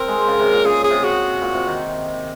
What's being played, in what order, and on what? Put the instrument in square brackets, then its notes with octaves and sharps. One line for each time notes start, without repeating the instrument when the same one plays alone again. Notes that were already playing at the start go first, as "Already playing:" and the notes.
Already playing: [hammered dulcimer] C4 [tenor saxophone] A#4
[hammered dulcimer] G#3
C#3
C3
A#2
[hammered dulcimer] C#3 [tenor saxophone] G#4
[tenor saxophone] G#4
[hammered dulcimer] C3
[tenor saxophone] F#4
[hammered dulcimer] A#2
C3
D#3